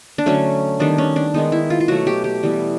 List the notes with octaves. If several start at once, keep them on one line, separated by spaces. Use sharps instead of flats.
D4
D3 F#3 A3 C#4
D#3 G3 B3 D4
C#4
D4
D#3 G#3 B3 D#4
E4
F4
F4
B2 F#3 A3 F#4
G4
G4
E3 G3 B3